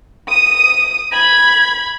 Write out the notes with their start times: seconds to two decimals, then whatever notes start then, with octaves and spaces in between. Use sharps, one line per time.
0.28 D#6 D#7
1.11 B5 G#6